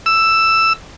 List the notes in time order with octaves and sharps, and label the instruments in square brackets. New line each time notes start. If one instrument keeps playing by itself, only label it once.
[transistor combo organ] E6